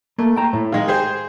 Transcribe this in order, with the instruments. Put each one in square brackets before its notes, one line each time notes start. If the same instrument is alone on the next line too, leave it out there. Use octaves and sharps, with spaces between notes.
[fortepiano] A3 [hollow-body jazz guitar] A#3
[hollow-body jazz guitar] G5 A#5
A2
[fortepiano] D#3 G#3 [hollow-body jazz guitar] F5
[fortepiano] G4 G#4 C5